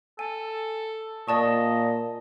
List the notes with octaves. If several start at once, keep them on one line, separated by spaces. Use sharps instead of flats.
A4 G#5
A#2 D5 D#5 A5 C#6